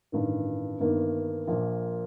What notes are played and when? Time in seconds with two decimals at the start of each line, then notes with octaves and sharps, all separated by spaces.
0.12 A1 G2 D#3
0.80 G1 G2 D#3 A#3
1.47 A#1 A#2 F3 A#3